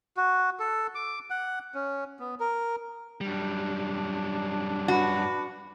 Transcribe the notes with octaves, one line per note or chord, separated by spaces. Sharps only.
F#4
A4
D6
F#5
C#4
B3
A#4
F#2 G3 D4
F#4 B4